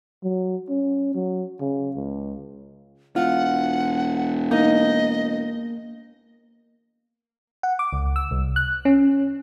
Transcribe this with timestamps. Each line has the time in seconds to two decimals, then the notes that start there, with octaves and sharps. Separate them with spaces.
0.23 F#3
0.69 C#4
1.14 F#3
1.60 C#3
1.96 C#2
3.16 E1 F4 F#5
4.51 A#3 D#4 D#5
7.63 F#5
7.79 D6
7.93 C#2
8.16 E6
8.31 C2
8.56 F#6
8.85 C#4